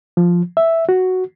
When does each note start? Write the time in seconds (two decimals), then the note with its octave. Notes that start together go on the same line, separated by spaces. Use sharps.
0.17 F3
0.57 E5
0.89 F#4